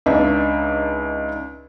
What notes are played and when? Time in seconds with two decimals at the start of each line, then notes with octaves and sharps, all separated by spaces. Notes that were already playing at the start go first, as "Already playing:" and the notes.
0.06 C#2 D4 D#4 E5